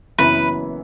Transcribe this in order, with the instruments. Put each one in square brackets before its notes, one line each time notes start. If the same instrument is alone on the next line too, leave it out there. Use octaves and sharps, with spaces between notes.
[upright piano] F#1 F#2 E3 B3 E4 [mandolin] B4